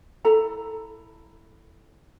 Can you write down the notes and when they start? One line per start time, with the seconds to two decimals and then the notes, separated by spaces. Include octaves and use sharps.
0.25 E4 A4 A#5